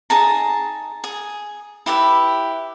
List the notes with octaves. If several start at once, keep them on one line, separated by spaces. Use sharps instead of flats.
D#4 G#4 A5 A#5
G#4
E4 G4 B4 E5